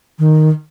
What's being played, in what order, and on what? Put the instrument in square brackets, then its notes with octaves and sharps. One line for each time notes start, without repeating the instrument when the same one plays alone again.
[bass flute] D#3